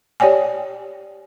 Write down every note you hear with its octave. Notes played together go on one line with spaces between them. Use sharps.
G4 C#5 D5 G5 G#5